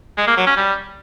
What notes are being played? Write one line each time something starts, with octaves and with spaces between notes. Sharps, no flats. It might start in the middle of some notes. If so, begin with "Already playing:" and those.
G#3
A#3
F#3
C#4
G3